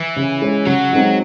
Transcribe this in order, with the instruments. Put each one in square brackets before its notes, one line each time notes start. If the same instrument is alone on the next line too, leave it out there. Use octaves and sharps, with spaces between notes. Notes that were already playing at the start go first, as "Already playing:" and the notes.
Already playing: [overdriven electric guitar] E3
[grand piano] C#3
G#3 C#4
[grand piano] C#3 [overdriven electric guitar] F#3
[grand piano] G#3 C4 D#4 F#4